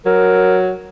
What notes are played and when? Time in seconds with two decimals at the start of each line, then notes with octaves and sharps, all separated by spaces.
0.06 F#3 A#4